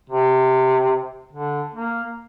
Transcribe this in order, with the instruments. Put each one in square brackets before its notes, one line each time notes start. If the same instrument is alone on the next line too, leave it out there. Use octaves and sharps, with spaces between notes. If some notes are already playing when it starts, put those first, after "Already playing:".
[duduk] C3
D3
A#3